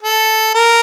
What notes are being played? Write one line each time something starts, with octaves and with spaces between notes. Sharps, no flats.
A4
A#4